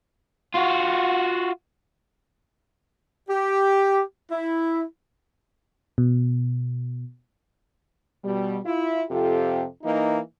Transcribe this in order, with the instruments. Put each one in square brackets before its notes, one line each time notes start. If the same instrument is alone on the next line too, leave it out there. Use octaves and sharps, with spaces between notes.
[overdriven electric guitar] F4 F#4
[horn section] G4
E4
[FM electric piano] B2
[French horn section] B2 G3
E4 F4
F2 C3 F4 G4 A4
E3 A#3 D#4